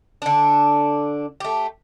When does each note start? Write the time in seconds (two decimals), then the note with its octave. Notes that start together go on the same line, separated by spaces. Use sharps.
0.22 D3 D4
1.40 A3 G4